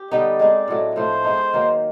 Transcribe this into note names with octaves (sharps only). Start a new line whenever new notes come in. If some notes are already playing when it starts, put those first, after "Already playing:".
Already playing: G4
D3 G3 B3 D#4 D5
G#3 C4 D#4
A2 F#3 A3
A2 F3 A3 C5
G#3 B3 D#4
D#3 F#3 A#3